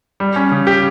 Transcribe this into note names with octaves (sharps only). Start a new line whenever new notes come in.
G3
C#4
C#3
G4